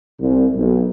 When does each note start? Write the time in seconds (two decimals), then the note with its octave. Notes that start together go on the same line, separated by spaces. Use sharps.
0.20 C2
0.56 B1